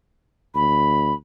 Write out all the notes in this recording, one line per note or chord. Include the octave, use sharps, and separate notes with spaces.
D2 B5